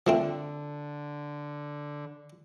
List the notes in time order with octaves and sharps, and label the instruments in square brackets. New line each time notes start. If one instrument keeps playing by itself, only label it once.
[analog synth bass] D3 [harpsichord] F3 A3 C4